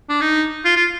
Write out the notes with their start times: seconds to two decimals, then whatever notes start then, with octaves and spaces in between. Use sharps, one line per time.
0.09 D4
0.21 D#4
0.65 F4
0.76 F4